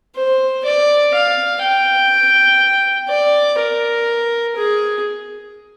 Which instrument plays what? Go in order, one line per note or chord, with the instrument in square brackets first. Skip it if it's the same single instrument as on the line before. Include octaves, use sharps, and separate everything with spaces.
[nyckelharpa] C5
D5
F5
G5
D5
A#4
G#4